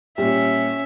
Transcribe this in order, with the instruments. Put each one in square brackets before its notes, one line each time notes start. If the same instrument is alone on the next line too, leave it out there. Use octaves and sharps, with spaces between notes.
[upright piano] A#2 G3 [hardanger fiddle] C#4 E5